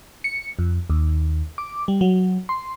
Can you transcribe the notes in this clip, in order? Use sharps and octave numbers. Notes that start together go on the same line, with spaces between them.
C#7
F2
D#2
D6
G3
F#3
C6